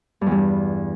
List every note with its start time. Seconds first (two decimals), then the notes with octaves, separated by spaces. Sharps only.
0.21 G2
0.26 E2
0.31 G2